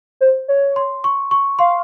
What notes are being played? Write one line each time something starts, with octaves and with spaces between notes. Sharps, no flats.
C5
C#5
C6
C#6
C#6
F5 C6